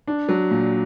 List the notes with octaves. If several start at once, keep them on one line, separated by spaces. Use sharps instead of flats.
D4
F#3
A#2